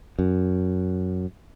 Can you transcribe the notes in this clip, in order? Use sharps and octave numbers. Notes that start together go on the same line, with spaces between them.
F#2